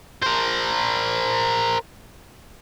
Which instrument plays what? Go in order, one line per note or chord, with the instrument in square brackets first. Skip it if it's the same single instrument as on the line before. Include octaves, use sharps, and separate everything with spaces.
[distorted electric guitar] A#4 C5